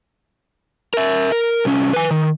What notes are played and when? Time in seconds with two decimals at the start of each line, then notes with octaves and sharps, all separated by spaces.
0.94 A#4 E5
1.32 A#4
1.65 C2 C#4
1.93 B4 G#5
2.11 D#3